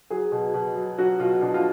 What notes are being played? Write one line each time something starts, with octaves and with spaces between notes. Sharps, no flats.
F#3 G#4
B2
B2
F#3
F#3 F#4
B2 F4
B2 D4
F4